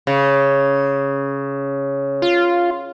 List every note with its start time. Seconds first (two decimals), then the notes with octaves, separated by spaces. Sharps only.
0.07 C#3
2.22 F4